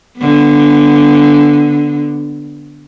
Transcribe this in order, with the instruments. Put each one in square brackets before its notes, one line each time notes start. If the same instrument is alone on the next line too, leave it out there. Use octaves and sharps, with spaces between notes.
[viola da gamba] D3 B3